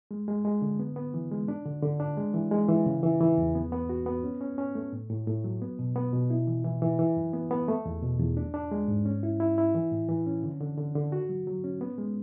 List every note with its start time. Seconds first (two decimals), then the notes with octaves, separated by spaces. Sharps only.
0.11 G#3
0.28 G#3
0.45 G#3
0.62 D3
0.80 B3
0.96 B3
1.14 E3
1.31 G#3
1.48 D4
1.65 D3
1.83 D3
2.00 D4
2.17 G#3
2.34 E3
2.52 G#3
2.69 E3
2.86 C#3
3.03 E3
3.21 E3
3.38 E2
3.55 B3
3.72 B3
3.89 F#4
4.06 B3
4.24 C#4
4.41 C#4
4.58 C#4
4.75 A3
4.93 A2
5.10 A2
5.27 A2
5.44 F#3
5.62 B3
5.79 B2
5.96 B3
6.13 B2
6.30 E4
6.47 E3
6.65 E3
6.82 E3
6.99 E3
7.16 F#2
7.33 B3
7.51 B3
7.68 A3
7.86 E2
8.03 B2
8.20 E2
8.37 D4
8.54 D4
8.71 G#3
8.88 G#2
9.05 C#4
9.23 E4
9.40 E4
9.58 E4
9.75 E3
9.92 A2
10.09 E3
10.27 C#4
10.43 D3
10.61 D3
10.77 D3
10.95 D3
11.12 F#4
11.29 F#3
11.47 F#3
11.64 C#4
11.81 B3
11.98 G#3